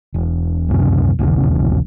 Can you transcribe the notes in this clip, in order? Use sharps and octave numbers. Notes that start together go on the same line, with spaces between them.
E1
C#2 F#2 C3
D#1 B1 E2 C#3